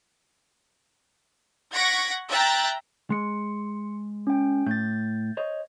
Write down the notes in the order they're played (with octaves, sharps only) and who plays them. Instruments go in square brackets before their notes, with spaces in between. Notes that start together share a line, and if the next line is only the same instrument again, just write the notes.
[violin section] F#5 C#6 G#6 A#6 B6 D7
E5 G5 A#5 F#6 A6
[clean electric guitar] G#3 [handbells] C6 C#7
[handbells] C#4 G5
[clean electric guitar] A2 [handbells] G6 A6
[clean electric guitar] C5 C#5 D#5